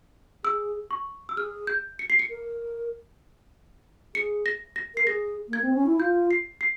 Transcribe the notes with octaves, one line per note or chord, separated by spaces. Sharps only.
G#4 E6
C#6
E6
G#4 F6
G6
C#7
C7
C#7
A#4
G#4 C#7
A#6
A#6
A#4 C7
G#4 A#6
A#3 G#6
C4
C#4
E4
F4 G6
C7
C7